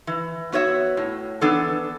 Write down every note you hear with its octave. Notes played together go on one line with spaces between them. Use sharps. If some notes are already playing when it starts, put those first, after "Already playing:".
E3
B3 F#4 C#5 E5
A2
E3 B3 D4 A4